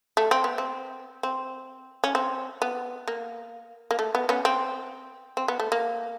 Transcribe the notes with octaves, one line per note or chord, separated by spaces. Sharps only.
A3
C4
B3
C4
C4
C#4
C4
B3
A#3
A#3
A3
B3
B3 C#4
C4
C4
B3
A3
A#3